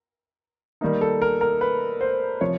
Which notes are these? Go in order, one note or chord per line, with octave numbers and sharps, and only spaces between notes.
D#3 G3 A#3 D#4
A4
A#4
A#4
B4
C5
C3 F3 C#5